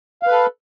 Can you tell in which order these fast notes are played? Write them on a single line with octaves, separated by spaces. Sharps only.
F5 B4 A4